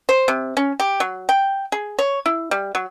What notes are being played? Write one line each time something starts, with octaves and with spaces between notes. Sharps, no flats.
C5
C3
C#4
G4
F#3
G5
G#4
C#5
E4
G3
F#3